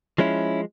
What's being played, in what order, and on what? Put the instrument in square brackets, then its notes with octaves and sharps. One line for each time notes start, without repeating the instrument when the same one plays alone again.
[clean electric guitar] F3 G#3 C#4 E4